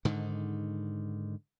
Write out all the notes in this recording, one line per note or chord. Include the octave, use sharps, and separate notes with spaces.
G#2 D3 D#3